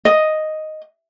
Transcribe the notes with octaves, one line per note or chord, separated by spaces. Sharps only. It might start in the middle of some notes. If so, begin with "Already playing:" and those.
D#5